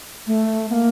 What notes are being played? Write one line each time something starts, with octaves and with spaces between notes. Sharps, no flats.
A3
B3
A#3